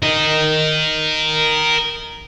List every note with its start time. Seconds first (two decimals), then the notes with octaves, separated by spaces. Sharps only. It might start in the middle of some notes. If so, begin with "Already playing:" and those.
0.03 A#4 D#5